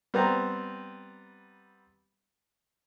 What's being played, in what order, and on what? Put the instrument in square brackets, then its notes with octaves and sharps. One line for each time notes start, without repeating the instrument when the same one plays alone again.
[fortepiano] G3 B3 C4 A#5